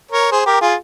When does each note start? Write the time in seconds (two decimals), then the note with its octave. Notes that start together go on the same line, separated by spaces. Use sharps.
0.11 A#4 C#5
0.32 G#4 C5
0.46 G4 A#4
0.61 F4 G#4